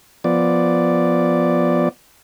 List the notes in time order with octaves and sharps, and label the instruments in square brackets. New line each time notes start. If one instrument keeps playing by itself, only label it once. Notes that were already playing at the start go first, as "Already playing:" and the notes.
[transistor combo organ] F3 B3 D5